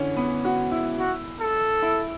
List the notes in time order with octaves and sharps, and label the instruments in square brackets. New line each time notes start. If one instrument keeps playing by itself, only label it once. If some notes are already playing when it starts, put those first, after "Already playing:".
Already playing: [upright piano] D3 E3 C#4
B3
F#4
E4
[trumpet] F#4
A4
[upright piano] E4